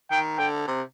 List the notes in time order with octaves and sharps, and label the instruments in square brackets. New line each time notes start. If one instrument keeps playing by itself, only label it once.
[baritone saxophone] D#3 [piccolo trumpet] G5
[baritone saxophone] D3 [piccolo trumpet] G5
[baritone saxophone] C3